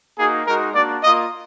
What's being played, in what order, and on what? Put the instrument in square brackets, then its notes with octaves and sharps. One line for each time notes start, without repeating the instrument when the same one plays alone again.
[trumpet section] A#3 D#4 F#4 G#4
G#3 D#4 F#4 A#4
A#3 D4 F#4 D5
A#3 F4 D#5